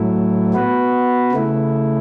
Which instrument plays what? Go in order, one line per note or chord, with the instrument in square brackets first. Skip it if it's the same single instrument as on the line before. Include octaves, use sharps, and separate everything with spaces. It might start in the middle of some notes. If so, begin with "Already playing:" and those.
Already playing: [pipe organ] A2 F#3 A3 E4
B3 F#4 B4
C#3 A3 E4